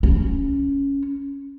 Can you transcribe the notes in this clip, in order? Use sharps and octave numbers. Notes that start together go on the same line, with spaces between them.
C#4